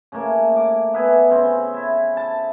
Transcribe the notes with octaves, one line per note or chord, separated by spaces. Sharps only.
C#3 A3 A#3
D6
B3 B4 E5 G#5
C#3 C4
E4
A5